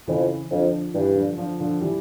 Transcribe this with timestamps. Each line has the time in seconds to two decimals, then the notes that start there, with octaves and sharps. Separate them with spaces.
0.07 F2 C#3 E3
0.51 F2 D3 F3
0.94 G2 E3 G3
1.16 D3 F3
1.37 D3 F3
1.60 D3 F3
1.81 E3 G3